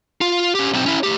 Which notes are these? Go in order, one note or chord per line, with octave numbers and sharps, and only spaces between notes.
F4
C#4 G4
B1 C4
C#4 E4
A3 G4